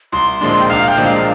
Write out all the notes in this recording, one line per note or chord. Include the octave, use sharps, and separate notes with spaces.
C2 C6
A#2 F3 G#3 D4 C6
G5
C2 F5
G5
A#2 F3 G#3 D4
F5